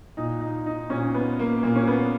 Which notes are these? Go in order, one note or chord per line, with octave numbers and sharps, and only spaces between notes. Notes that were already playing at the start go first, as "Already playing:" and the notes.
A#2 D#4
D#4
D#4
A#2 C#4
B3
A#3
A#2 A#3
C#4
B3